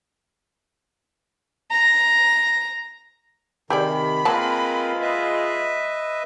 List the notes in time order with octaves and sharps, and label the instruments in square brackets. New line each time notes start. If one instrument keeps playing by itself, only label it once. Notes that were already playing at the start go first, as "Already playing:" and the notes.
[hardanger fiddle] A#5
[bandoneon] C3 D#3 [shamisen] G4 G#4 D5 [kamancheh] B5
[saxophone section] G#3 F4 [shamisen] A#3 A5 [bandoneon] C4 A#4 B4
[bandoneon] B4 D#5 E5